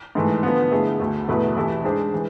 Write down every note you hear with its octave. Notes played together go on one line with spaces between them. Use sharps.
G#2 E3 A3
D3 F3 B3
D3 A3 E4 G#4
D2 D3 A3
E2 B2 A3 E4 B4
C3 E3 A3 E4 A4
G#2 G#3 D4 G#4 C5
E3 G#3